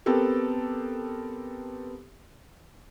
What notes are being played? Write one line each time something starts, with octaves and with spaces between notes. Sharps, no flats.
B3 C4 G4 A4 A#4